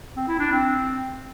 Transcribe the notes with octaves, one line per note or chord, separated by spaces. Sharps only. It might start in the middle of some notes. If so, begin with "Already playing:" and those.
C4
E4
D4
C4